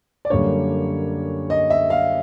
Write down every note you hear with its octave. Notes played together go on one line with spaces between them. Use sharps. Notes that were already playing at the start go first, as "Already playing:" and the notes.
D5
F#2 D3 G3 A#3 D4 C#5
D#5
E5
F5